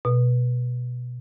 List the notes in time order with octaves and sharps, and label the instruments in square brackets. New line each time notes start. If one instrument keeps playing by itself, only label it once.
[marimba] B2